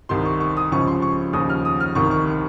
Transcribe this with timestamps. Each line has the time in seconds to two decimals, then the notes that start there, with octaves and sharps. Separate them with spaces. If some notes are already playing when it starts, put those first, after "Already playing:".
0.09 C2 C3 D#3 C6
0.25 C#6
0.40 C#6
0.57 D#6
0.71 C#2 C#3 F3 C#6
0.87 C6
1.02 C#6
1.33 D#2 C#3 F3 D#6
1.50 F6
1.65 D#6
1.80 F6
1.95 C2 C3 D#3 C#6
2.11 C#6